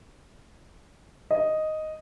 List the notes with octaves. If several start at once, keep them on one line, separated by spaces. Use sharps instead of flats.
D#5